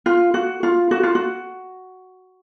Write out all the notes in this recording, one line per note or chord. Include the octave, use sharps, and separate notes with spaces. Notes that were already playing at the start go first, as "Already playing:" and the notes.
F4
F#4
F4
F#4
F4
F#4